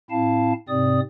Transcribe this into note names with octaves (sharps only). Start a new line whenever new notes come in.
A2 C4 E4 F5 A5
G#2 C3 C4 D5 D#6